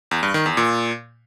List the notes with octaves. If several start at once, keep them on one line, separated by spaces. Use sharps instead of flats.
E2
G2
D#3
E2
A#2